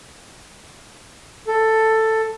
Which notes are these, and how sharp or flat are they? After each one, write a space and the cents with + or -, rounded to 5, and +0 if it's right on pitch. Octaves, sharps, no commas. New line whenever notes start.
A4 +10